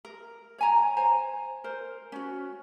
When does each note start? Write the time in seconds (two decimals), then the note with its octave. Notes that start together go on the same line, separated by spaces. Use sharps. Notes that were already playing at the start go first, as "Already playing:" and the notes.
0.05 A#4
0.58 C#5 G#5 A#5
0.97 C5 G#5 A#5
1.64 A#4 C5
2.12 C#4 F#4